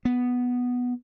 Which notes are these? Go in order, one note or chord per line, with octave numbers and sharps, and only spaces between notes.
B3